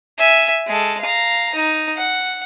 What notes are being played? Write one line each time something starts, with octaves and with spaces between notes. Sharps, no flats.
E5 G#5
G#3 A4
F5 A#5
D#4
F#5